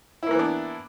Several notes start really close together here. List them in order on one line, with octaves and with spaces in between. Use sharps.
E4 A#3 E3 B3 D4